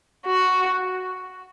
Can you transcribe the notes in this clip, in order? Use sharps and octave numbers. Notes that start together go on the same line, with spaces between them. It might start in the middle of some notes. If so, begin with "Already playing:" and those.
F#4